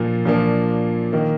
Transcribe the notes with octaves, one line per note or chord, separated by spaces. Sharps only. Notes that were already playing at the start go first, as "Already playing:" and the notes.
Already playing: A#2 F3 A#3 D4
A#2 F3 A#3 D4
D#3 A#3